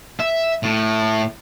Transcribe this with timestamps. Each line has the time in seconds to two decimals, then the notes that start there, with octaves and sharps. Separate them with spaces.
0.20 E5
0.63 A2